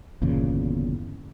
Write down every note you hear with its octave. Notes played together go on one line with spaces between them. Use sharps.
G1 E2 A#2 C#3